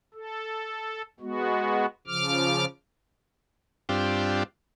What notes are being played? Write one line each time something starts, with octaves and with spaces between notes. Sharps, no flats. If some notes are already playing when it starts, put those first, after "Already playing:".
A4
G#3 B3 F#4
C#3 F3 D6 F6
G2 C4 D4 F4 G4